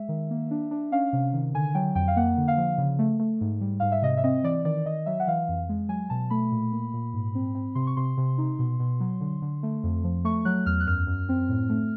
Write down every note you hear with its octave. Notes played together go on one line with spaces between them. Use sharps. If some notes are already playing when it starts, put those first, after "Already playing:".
Already playing: G#3 E5
D#3
A#3
D4
D4
C#4 F5
C3
D#3
D3 G#5
F#3 G5
F2 G5
F5
A#3 F#5
D3
F5
F3
C#3
A3
A3
G#2
G3
G#2 F5
E5
C3 D#5
E5
C4 D#5
E3 D5
D#3 D5
D#3 D#5
F#3 E5
F#5
E3 F5
F2
G#3
F#3 G#5
B2 A5
A3 B5
A#2
A#3
A#2
G#2
C4
C4
C3 C6
C#6
C3 C6
C3
D#4
B2
B2
F#3
D3
D3
A3
F2
F3
A3 C#6
F#3 F#6
E2 F6
F#6
F#2 F6
F#2
C4
A2
A3